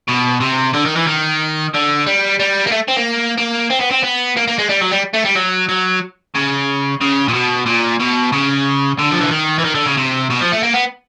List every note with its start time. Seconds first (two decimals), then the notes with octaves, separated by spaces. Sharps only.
0.09 B2
0.41 C3
0.74 D3
0.86 D#3
0.97 E3
1.07 D#3
1.74 D3
2.06 G3
2.39 G3
2.67 A#3
2.72 A3
2.88 C4
2.97 A#3
3.38 A#3
3.71 C4
3.81 B3
3.92 C4
4.04 B3
4.37 A#3
4.48 A#3
4.59 G#3
4.69 G3
4.81 F#3
4.92 G3
5.14 A3
5.25 G3
5.36 F#3
5.69 F#3
6.35 C#3
7.01 C#3
7.28 A#2
7.34 B2
7.66 A#2
8.00 B2
8.32 C#3
8.98 D3
9.11 F3
9.21 E3
9.31 D#3
9.59 E3
9.64 D#3
9.75 D3
9.86 C#3
9.97 C3
10.30 B2
10.41 F3
10.52 A3
10.63 A#3
10.74 B3